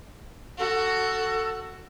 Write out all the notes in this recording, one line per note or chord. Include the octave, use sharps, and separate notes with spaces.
F#4 A4